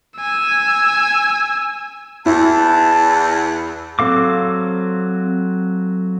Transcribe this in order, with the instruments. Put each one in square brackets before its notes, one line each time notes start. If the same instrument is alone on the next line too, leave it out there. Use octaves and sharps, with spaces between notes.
[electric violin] G#5 E6
[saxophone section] E2 [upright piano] E4 [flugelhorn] A5
[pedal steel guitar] F#3 C4 A4 F5 D6